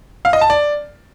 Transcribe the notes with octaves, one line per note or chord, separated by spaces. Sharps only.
F5
D#5
A5
D5